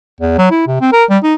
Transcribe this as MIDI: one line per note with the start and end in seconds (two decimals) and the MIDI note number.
0.21 0.34 40
0.38 0.47 54
0.51 0.63 64
0.67 0.81 48
0.81 0.89 60
0.92 1.04 70
1.10 1.18 55
1.23 1.35 63